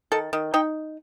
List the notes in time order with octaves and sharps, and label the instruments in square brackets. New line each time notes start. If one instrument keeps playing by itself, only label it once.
[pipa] D#3 A4
D#3
D#4 G5